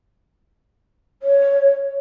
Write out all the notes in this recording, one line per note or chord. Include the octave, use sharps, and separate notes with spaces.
C#5